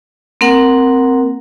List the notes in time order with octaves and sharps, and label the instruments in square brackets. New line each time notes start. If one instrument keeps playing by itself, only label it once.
[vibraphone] A#3 C4 A#4 F#5